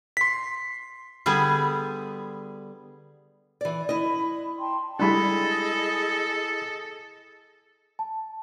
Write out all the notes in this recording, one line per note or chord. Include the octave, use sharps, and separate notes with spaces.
C6 B6
D3 G3 B3 G#4
E3 D5
E4 D#5 B5
G5 A5 C6
G3 G#3 D4 E4 G#4 A4 D#5 B5
A5